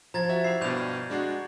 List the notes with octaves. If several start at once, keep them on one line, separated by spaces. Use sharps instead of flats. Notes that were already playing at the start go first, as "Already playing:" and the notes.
F3 A#5 G#6 A6
F#4 E5
E4 G4 B5 C7
G2 B2 D5 F5 G6 F7
G#3 D4 F#4